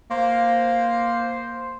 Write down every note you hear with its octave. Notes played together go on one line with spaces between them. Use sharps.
A#3 C5